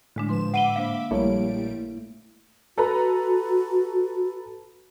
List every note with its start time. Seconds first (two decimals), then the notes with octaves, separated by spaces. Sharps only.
0.16 A2 D3 G#3 D4
0.29 F3 B4 C6 E7
0.54 E5 F#5 B5 D6 D#7 G7
0.76 A#3 D4 C5 F5
1.11 A#1 G3 A3 A#3 E4 C#5 D7
2.78 F#4 A4 B4 A#5